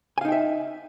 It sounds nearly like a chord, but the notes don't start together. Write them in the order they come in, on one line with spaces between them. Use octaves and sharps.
G#5 F5 D#4 G5 E5